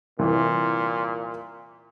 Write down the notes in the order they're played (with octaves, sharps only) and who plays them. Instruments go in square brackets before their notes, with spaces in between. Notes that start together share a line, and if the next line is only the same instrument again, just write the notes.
[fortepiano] C2 E3 [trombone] A#2